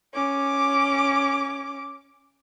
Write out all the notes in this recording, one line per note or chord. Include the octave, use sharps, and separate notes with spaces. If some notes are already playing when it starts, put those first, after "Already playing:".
C#4 D6